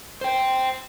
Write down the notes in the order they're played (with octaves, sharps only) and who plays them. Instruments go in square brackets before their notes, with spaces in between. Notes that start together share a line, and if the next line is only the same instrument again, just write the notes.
[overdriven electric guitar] C5 G5